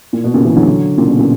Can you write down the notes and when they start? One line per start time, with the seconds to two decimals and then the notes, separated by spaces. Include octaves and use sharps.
0.13 A#2
0.24 B2
0.34 A#2 C#3
0.45 C#3 E3
0.56 D3 F#3
0.98 A#2 C#3
1.09 B2
1.19 A#2 C#3